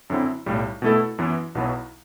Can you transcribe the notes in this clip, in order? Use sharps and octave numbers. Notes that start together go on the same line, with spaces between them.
F#2 D3 F#3 C4 E4
B1 A2 G3
B2 A3 E4 A4
F#2 E3 B3
B1 B2 F#3 B3 E4